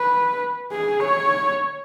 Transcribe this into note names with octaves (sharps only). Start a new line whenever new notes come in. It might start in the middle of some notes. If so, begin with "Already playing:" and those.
Already playing: B4
G#4
C#5